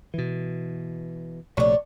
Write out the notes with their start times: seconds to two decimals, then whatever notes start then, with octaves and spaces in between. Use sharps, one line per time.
0.14 B2 E3
1.57 A#1 C3 A3 D4 C#5